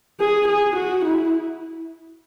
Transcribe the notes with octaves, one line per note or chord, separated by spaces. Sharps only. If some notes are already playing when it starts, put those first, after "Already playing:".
G#4
G#4
F#4
E4